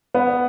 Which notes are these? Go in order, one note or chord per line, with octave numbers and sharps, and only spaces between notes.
B3